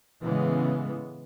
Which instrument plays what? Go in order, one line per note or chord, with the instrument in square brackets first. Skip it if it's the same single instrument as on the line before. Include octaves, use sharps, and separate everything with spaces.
[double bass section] A2 C#3 E3 G#3 B3